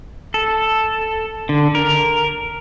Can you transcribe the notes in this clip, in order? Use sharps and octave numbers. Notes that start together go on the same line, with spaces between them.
A4
D3
A#4